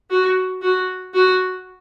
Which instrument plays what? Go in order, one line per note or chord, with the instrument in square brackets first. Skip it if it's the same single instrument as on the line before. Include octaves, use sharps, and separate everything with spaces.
[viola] F#4
F#4
F#4